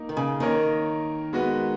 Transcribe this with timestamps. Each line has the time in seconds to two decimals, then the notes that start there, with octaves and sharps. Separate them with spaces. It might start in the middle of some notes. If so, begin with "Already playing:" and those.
Already playing: A#3 D#4 A#4
0.09 D#3
0.17 C#3
0.40 D#3 A#3 D#4 A#4 C#5
1.33 G#3 B3 F#4 B4